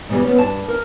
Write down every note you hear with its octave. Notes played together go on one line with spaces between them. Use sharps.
G#2 B2 E3 G3 G#4
B3 C#4
G2 A5
A#4